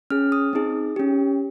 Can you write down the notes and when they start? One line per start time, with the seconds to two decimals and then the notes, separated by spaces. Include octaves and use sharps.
0.10 C#4 G#4 F6
0.32 D#6
0.53 C4 D#4 G#4
0.96 C#4 G4